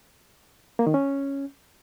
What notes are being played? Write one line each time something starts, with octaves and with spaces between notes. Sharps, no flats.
A#3
D#3
C#4